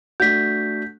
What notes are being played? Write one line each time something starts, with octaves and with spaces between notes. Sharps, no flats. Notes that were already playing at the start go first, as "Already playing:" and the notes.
A3 D4 F#4 G6 B6